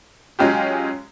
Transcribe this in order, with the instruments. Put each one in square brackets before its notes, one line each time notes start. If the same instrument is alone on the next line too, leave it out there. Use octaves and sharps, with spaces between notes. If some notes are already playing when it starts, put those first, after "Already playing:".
[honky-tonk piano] F#3 G#3 C#4 F4 G4